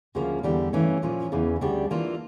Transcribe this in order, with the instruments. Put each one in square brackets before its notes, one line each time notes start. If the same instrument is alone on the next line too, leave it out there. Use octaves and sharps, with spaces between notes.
[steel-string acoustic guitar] D2 C#3 F3 A#3
E2 D3 G3 D4
G2 E3 A3 C#4
A#2 F3 C#4
E2 C#3 E3
D2 C#3 G3 D4 G4
E3 A#3 D4 F4